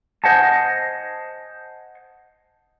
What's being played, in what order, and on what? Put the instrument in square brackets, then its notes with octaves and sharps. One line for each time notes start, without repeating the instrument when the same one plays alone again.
[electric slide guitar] C5 D#5 F#5 G#5 A5